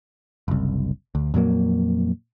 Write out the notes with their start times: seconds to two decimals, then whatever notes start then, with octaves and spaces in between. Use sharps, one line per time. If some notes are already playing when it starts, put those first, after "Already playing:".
0.48 F#1 C2
1.15 D2
1.34 F2 A#2 F#3 A#3